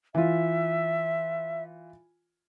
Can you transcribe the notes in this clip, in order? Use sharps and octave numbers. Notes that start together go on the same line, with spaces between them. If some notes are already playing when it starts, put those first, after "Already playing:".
E3 F4 E5